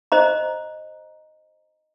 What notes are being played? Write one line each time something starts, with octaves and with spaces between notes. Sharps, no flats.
C5 D#5 A#5